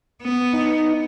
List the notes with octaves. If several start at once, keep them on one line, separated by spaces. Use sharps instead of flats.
B3
D#4